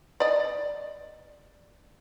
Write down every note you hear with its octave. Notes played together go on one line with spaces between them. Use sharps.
D5 D#5